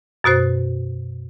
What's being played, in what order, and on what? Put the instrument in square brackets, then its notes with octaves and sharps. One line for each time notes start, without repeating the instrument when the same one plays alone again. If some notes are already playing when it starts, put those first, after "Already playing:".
[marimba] F#2 B2 F#4 C5